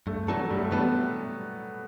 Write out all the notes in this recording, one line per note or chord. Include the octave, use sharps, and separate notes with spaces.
G2 A3
E3 F#3 A3 D4 A4
G2 G3
A3
G3
E3 A3 B3 D4 A4